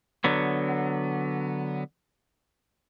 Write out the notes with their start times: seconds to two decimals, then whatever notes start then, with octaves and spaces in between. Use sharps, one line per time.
0.24 D3 F#3 B3